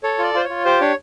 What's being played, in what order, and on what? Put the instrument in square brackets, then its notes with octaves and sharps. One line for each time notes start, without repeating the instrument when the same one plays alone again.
[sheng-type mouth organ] A4 C#5
F4 D5
F4 C5
C#5
F4
G4 C5
D4 C#5